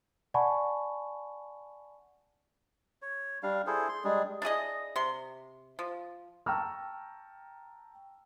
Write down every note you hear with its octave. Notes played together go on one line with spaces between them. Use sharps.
D5 F#5 G#5 A5 B5 C#6
C#5
G3 D4 F5
E4 G#4 A4 C5
C6
G3 G#3 D4 G#4
D4 E4 G#4 D#5
C3 C6
F3
G5 A5 A#5 C#6 E6 F6